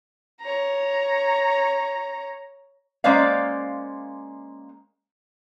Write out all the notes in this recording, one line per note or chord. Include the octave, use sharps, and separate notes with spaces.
C#5 A#5
G#3 A#3 C#4 C5 D5 F5